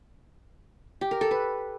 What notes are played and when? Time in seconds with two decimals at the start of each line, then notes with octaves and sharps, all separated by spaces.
1.01 G4
1.11 A#4
1.21 A4
1.31 B4